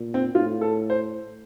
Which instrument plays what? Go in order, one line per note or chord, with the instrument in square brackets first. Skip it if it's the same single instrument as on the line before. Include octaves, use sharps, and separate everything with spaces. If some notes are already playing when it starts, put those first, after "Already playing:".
Already playing: [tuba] A#2
[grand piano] C4
[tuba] A2 [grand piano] F4
[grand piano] A4
C5